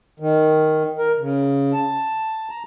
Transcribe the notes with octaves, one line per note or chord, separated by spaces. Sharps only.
D#3
A#4
C#3
A5
A#5